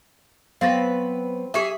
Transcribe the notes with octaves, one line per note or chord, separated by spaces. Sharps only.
F#3 B3 C4 B4 D5 F5 A6 A#6
G4 G#4 E5 D6 D#6